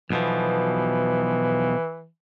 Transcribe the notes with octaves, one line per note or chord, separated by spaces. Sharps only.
B1 B2 E3 F3